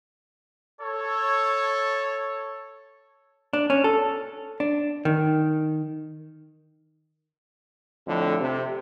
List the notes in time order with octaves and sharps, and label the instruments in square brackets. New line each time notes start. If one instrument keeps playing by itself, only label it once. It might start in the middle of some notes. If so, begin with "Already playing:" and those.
[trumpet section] A4 C#5
[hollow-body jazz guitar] D4
C#4
A4
D4
D#3
[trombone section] F2 A2 D3
C3